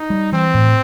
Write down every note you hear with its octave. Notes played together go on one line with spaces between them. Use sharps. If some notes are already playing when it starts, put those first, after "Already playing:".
Already playing: D#4
G3
E3 C4
A2